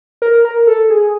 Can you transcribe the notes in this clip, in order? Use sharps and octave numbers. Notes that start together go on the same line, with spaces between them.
A#4
A#4
A4
G#4